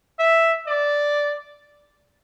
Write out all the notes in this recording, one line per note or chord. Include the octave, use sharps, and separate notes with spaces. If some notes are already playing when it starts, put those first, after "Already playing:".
E5
D5